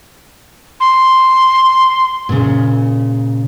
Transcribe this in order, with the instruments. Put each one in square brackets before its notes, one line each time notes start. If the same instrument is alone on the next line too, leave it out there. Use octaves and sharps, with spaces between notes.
[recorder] C6
[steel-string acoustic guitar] A#2 C#3